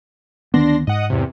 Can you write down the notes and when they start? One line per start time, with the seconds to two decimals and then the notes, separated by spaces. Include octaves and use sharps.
0.54 D2 D#3 B3 D4 C6 A#6
0.87 G#2 D#5 F#5 D#6
1.10 E2 C3